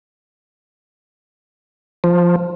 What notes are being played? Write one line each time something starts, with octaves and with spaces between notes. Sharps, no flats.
F3